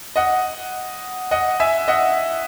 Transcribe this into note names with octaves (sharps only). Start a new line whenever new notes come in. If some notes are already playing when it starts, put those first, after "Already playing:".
D#5 F#5
D#5 F#5
E5 G#5
D#5 F#5